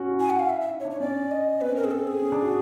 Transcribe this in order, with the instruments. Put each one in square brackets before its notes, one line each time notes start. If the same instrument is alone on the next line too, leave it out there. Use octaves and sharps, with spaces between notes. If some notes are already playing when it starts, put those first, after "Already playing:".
Already playing: [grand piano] C#4 F#4
E4
[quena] G#5
F#5
F5
E5
E5
[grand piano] D#4
[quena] C#5
[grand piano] D4
[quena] C#5
[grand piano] C#4 [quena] D5
[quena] D#5
[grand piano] C4 [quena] B4
[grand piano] C#4 [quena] A#4
[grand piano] C4 [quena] G#4
[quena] A4
G#4
[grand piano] C#4
D4
F#4